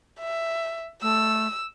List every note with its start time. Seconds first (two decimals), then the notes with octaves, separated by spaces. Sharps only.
0.20 E5
1.02 A3 E6